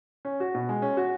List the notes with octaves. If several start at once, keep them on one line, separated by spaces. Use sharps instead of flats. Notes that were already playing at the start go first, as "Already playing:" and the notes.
C#4
F#4
B2
G#3
C#4
F#4